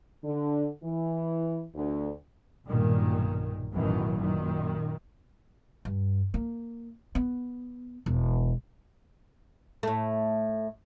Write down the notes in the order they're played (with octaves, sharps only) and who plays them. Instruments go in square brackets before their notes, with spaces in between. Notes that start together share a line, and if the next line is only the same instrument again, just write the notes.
[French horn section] D3
E3
D2
[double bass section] B1 G2 A#2 D#3
A1 F#2 B2 D#3 E3 F#3
F#2 A#2 D#3
[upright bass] G2
A#3
B3
E1
[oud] A2 A3